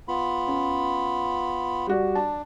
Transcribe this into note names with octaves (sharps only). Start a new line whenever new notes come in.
B3 F4 B5
C#4
G3 F#4 D5
D4 A5